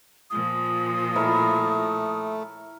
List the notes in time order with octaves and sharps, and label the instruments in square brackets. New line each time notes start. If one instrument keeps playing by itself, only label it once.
[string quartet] A#2 F3 [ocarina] D#6
[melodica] A3 [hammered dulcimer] E4 A#4 C#5